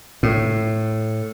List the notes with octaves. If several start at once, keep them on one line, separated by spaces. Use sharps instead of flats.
A2